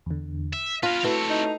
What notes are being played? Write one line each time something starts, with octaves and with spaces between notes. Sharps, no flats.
E2 D3
E5
F4 B4 F5 A5 A#6
A3 C4 E4 F#4 B4 C#5
D#4